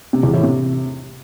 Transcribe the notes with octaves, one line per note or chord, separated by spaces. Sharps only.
C3
E2
A2
C3